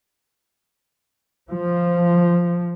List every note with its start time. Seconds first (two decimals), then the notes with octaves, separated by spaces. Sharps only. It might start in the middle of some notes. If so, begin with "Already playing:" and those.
1.50 F3